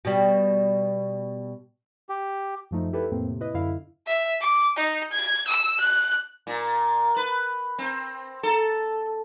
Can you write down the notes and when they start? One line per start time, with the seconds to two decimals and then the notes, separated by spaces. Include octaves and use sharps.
0.05 B2 G3
2.09 G4
2.71 F#2 F3 A3 D#4
2.93 E4 G4 A4 B4
3.11 F2 A2 A#3 C4
3.29 A2 C3
3.40 E4 B4 D#5
3.54 F#2 D3 E4 F5
4.06 E5
4.40 D6
4.77 D#4
5.12 G#6
5.48 E6
5.80 F#6
6.47 A#2
7.16 B4
7.78 C4
8.43 A4